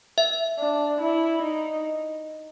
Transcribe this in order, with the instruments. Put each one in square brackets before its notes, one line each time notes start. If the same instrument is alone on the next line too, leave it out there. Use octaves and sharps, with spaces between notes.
[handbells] E5
[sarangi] D4
E4
D#4